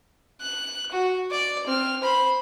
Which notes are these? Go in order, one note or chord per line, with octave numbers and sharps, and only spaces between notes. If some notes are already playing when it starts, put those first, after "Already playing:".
F#6
F#4
D5
C4 F6
C5 B5